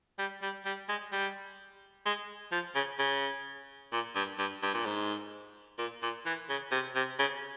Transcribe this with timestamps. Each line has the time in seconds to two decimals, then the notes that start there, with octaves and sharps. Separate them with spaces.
0.19 G3
0.42 G3
0.66 G3
0.89 G#3
1.13 G3
2.06 G#3
2.52 F3
2.75 C#3
2.99 C#3
3.93 A#2
4.16 G2
4.39 G2
4.63 G2
4.74 A#2
4.86 G#2
5.79 A#2
6.03 A#2
6.26 E3
6.50 C#3
6.72 C3
6.96 C3
7.19 C#3